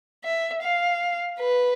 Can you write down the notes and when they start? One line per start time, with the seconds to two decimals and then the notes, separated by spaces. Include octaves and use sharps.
0.24 E5
0.63 F5
1.39 B4